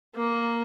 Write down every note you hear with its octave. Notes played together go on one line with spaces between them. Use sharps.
A#3